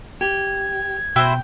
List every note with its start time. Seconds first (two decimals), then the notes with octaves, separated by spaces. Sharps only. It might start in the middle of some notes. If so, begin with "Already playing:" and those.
0.21 G4 G#6
1.16 B2 E4 F#4 C5 G5